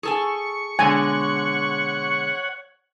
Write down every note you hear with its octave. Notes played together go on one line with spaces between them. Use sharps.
G#4 A4 G#5 C#6
B2 D3 G#3 C#5 F#5 G#5